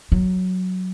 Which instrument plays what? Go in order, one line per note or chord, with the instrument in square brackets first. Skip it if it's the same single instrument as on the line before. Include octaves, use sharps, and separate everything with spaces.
[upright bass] F#3